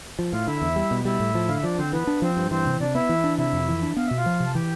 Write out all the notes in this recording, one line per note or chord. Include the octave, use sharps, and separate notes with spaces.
F3
A2 F4 F5
D3 E4 E5
E2
G3
B2
G3 E4 E5
A2
F3
D3 F5
E5
F3 D4 D5
D3 C4 C5
E3 B3 B4
D4
F3 C4 C5
G2
E3 C4 C5
C3
C3 D4 D5
B3 E4 E5
E3
D4
C3 E4 E5
F2
E3
D4
B3 F5
B2 E5
F4 F5
F3
C3
A5
E3 G4 G5